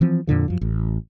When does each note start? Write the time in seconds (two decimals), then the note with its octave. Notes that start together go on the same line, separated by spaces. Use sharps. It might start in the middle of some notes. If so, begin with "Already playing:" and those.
0.01 E3 F3 C4
0.27 F2 A#2 D3 F3
0.48 F#2 F3
0.61 A1